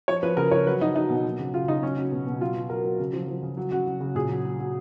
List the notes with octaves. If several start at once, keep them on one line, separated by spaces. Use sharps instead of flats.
F3 C#5
F3 B4
C#3 A#4
F3 C#5
F#3 B4
F#3 D#4
F#3 D#4
B2
F#3
C#3
C#3 F4
C#3 D#4
F#3 C#4
F#3
B2
B2
F#3 F4
F#3
F#3 A#4
F#3
C#3
F3
F3
C#3
F#3
C#3 F#4
F#3
C#3
A#2 G#4
F#3
F#3
F#3